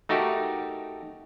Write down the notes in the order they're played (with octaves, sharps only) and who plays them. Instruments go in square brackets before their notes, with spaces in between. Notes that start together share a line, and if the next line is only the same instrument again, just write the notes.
[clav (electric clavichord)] A3 D#4 F#4 G4 A4 A#4